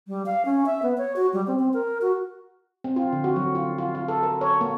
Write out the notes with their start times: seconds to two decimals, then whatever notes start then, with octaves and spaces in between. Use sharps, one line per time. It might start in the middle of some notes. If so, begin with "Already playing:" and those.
0.08 G3
0.26 F5
0.45 C#4
0.66 E5
0.83 B3
0.98 C#5
1.16 F#4
1.33 G3
1.47 C4
1.59 C4
1.74 A#4
2.01 F#4
2.84 C4
2.96 F4
3.12 D3
3.24 F#4
3.36 F#3
3.55 F4
3.78 F4
3.95 F4
4.08 A4
4.23 A#4
4.41 C#5
4.61 A#3